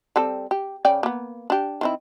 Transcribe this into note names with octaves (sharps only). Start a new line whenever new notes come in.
G3 C4 A4
G4
C#3 D5 G5
A#3 B3
D4 G4
D#3 C4 E4